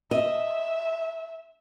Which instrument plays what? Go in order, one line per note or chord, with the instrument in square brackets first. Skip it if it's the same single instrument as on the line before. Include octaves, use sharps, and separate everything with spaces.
[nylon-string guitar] D#5 [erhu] E5